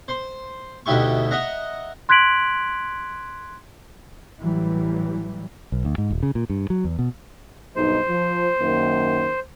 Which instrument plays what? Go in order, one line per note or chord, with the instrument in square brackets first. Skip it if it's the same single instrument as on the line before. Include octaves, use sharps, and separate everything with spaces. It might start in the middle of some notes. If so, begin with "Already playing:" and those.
[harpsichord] C5 C6
D2 B2 D#4 E4 G4 C#6
D#5 E5 F#5 A#5
[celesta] C6 F#6 G#6 B6 D7 F#7
[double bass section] A1 E3 F#3 G3
[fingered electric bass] B1
D2
G#2
D#1
C#3
A#2
G2
F#3
E2
B2
[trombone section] B1 G2 D#4 [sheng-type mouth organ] C5
[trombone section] F3
F#2 D#3 A#3